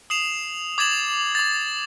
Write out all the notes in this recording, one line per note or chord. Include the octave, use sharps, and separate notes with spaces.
D#6 C7 E7 F7
D6 G#6 A6 E7 F#7
D6 A6